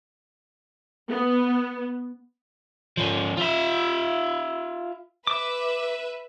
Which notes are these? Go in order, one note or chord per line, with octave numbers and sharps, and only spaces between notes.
B3
F3 C#4
F4 E5
B4 E5 D6